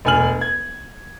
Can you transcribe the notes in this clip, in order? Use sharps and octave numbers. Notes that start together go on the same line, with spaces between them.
E1 D2 G#5 F6 F#7
G#6